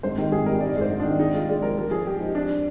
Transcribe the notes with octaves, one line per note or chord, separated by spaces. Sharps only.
G#1 C5
D#3 G4
G#1 G#4
G3 A#4
G#2 D5
G#2 C5
G#1
D4
D#3
G#3 D#4
G#3 F4
G#3 D5
F3 A#4
F3 A#4
F3 G#4
G#3 G4
F3 D#4
C4 D4
F3